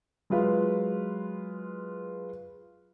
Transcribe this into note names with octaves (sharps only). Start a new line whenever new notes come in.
F#3 G#3 F4 B4 F5